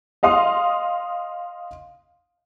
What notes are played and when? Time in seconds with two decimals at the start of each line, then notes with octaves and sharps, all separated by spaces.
0.23 D#5 F5 C6 D#6